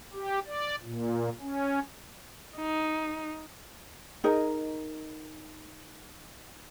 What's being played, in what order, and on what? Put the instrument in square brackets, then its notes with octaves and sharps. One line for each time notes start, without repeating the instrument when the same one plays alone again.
[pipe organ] G4
D5
A#2
C#4
[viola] D#4
[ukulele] D#4 G#4 A#4 D#5